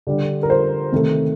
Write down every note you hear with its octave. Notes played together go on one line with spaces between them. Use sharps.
D3 G3 D4
A#4
C5
C3 D#3 A3